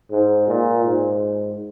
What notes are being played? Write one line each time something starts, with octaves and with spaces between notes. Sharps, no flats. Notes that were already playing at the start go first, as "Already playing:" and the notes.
G#2
A#2
G#2